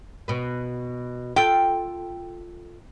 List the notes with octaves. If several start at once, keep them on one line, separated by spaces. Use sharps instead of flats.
B2 B3
F4 A4 G5